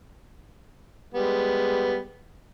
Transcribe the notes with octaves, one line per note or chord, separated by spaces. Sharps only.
G3 G#3 B3